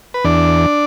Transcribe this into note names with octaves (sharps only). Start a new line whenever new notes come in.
B4
E2 D4 D5